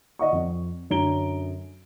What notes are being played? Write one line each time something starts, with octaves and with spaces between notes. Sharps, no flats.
D5 D#5 F#5 C#6
F2
F#2 D3 C#4 A#5 D7 G7